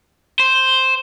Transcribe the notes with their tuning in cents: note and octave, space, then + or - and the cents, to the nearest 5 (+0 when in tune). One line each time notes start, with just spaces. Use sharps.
C5 +0